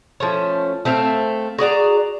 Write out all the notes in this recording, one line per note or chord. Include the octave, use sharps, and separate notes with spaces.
F3 A3 C#4
A3 C4 E5 F5
F#4 G#4 D5 A#5